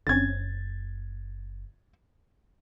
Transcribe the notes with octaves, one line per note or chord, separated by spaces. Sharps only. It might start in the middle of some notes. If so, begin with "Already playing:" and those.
F#1 D3 C4 C#4 G#6 A6